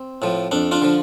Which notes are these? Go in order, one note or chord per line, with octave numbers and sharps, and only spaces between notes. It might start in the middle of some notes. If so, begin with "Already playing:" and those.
Already playing: C4
A2 F3
F2 D4
D4 F4
D3 F3